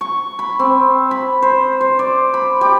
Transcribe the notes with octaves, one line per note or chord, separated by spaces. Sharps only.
C#6
B5
C4
B5
C5
C5
D5
B5
G4